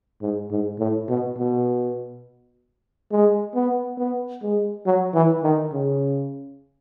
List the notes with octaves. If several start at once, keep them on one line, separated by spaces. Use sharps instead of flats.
G#2
G#2
A2
B2
B2
G#3
B3
B3
G#3
F#3
E3
D#3
C#3